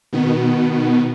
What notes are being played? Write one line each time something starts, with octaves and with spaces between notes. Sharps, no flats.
B2 D#3 B3